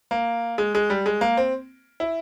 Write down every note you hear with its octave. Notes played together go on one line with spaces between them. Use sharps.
A#3
G#3
G#3
G3
G#3
A#3
C4
E4